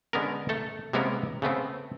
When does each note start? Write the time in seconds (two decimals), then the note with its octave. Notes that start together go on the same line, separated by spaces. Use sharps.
0.13 D3 G#3 B3 C#4 A#4
0.49 A3 A4
0.93 C3 G#3 A#3 B3 C#4 A#4
1.42 C#3 A3 B3 C4